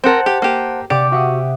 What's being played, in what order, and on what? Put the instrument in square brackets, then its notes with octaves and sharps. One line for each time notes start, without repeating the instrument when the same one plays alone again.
[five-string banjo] C4 A#4 [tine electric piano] C5 F#5 A5
[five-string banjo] G4
A#3 G4
[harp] C3 F#5 D6 [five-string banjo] G4 [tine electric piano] D5
[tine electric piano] F#4 [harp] E5 F#5 D#6